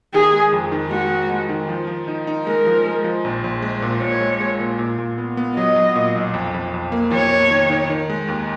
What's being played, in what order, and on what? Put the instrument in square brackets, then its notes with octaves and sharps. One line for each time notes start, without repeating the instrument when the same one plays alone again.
[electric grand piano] D#3 [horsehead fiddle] G#4
[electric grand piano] G#3
F2
D#3
[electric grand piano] G#3 [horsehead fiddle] F#4
[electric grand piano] G#3
G#3
D#3
F3
F3
D#4
D#4
[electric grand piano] G#3 [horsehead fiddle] A#4
[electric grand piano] F3
G#3
F3
A#1
A#1
G#3
A#2
[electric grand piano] A#2 [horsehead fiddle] C#5
[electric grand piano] G#3
G#3
A#2
A#2
A#2
B3
B3
[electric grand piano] F#3 [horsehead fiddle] D#5
[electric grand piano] F#3
A#2
B1
F2
F2
F2
A#3
[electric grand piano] F2 [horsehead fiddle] C#5
[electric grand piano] A#3
D#3
D#3
D#3
G#3
D#2